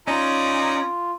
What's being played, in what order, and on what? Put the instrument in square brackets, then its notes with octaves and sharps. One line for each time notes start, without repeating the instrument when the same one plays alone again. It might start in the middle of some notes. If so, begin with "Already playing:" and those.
[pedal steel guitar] C#4 [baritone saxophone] D#4 [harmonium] F4 [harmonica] D5 A#5 B5